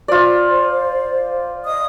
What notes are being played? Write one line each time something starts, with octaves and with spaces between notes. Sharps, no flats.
F4 C5 D5
D#5 D#6